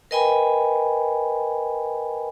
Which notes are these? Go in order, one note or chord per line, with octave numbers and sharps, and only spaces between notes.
A#4 B4 D#5 G5 G#5 B5